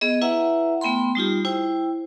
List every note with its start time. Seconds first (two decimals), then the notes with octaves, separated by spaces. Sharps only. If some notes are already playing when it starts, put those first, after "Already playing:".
0.01 B3 G#4 D#5
0.21 E4 B4 E5 F#5 A#5
0.81 A3 B3 G5 B5 C6
1.15 G3 D#4 F4 G4
1.45 E4 C5 G5